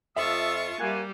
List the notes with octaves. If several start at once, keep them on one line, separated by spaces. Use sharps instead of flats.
F2 F4 E5 A5 C#6 D#6 E6
G3 A#3 C5 F#5 G#5